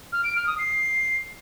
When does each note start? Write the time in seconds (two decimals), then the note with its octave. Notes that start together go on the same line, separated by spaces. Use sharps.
0.12 F6
0.24 D7
0.35 F6
0.47 D#6
0.58 C7